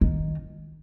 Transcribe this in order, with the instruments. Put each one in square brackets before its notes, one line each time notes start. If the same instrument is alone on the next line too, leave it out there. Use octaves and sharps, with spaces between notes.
[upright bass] D#3